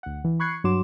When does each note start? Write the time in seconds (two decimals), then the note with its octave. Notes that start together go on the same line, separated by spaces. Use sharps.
0.03 D2 F#5
0.25 E3
0.40 B5 C#6 F#6 G#6 C7 C#7
0.64 G2 F#3 F#4 C6 D6 E7